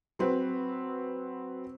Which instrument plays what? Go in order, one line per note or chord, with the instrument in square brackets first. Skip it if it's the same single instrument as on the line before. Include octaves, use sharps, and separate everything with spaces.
[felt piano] F#3 C4 B4